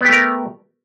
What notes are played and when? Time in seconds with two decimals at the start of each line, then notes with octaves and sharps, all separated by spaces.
0.01 B3
0.05 G4
0.08 A3
0.12 A#4